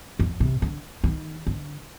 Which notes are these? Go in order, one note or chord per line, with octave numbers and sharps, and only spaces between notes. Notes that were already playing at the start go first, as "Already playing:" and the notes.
F2
C3
D3
D#3
D3